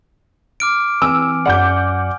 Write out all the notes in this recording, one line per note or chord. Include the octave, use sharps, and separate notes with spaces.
D6 F6 D7
E3 C4 B4 G#5 E6
F#2 D5 F#5 D6 G6